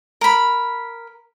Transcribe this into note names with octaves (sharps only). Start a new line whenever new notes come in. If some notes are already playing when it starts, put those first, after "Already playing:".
A#4 B5